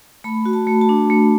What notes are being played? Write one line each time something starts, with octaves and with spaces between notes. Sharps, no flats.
A3 B5
F#4
A5
A3
A5
D4
A3